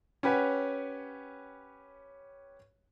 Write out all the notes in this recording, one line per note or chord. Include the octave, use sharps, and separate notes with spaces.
C#4 G4 B4 C#5 F#5 G#5